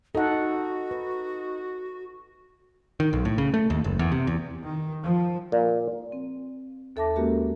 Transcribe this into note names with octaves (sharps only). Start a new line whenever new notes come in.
D#4 F#4 A4 F#5
B4
D#3
B1
A2
C#3
A3
D#2
F#1
E2
C3
E2
D#3
F3
A#2
C4
D#2 A4 E5 A5 D6 A#6
G#3 A#3 C#4 F#4 G4 A#4